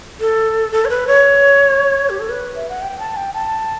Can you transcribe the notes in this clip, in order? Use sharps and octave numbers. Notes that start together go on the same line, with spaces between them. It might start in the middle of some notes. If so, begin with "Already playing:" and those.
A4
A4
C#5
B4
C#5
G4
A4
B4
E5
F#5
G5
A5
G5
A5